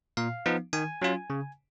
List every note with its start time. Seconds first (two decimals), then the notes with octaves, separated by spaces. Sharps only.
0.17 A#2 F5
0.46 F3 B3 D#4
0.73 D#3 G#5
1.02 F#3 C#4 F4
1.30 C#3